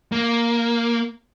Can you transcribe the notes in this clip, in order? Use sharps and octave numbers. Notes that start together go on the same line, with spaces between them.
A#3